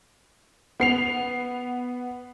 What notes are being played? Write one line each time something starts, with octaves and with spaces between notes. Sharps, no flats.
B3 C7 F7